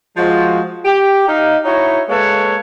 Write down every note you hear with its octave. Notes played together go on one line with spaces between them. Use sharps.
F3 G#3 F#4
G4
D#4 F5
D#4 E4 F#4 C#5
G#3 A#3 A4 B4 C#5 F5